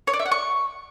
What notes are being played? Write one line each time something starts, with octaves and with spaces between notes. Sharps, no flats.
C#5
D5
E5
F#5
C#6